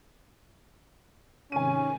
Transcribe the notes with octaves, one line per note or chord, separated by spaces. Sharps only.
G#2 C3 D#3 C#4 G#5 D#7